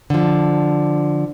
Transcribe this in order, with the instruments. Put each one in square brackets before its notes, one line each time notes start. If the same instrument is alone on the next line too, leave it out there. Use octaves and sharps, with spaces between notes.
[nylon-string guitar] D3 F3